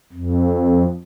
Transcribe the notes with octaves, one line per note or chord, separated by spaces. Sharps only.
F2